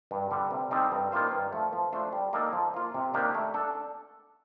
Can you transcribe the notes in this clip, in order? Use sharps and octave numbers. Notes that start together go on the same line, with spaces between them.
G2
D3 G3
C3
G3 C4 D#4 A4
G2
D#3 A#3 F4 C5
G2
F3 A3
F3
A3 D4 F4 C5
G3
A#3 D#4 A4 D#5
F3
A#3 F4
C3
D#3 A#3 D4 G4
A3
D4 A4